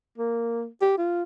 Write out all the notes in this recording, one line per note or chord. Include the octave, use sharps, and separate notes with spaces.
A#3
G4
F4